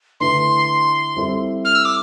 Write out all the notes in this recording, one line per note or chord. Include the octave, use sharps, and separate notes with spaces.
D3 A3 E4 B4 C6
G3 C4 E4 A4 C5
F6
E6
D6